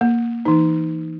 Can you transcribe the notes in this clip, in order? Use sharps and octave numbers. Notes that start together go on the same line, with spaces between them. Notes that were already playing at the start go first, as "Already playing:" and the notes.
A#3
E3 D#4